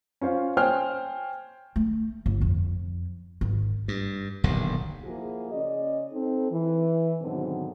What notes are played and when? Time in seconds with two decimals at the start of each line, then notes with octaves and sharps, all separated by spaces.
0.21 C#4 F4 C5 F5
0.57 C5 C#5 G5 G#5 F6
1.76 A3
2.26 G1
2.41 F2
3.41 G#1
3.88 G2
4.44 D#1 B1 G2 D3
5.04 F3 A#3 E4 F#4 G#4
5.52 C#3 C#4 D5 D#5
6.12 C4 D#4 A4
6.51 E3
7.21 G#2 B2 D3 D#3 F#3 C4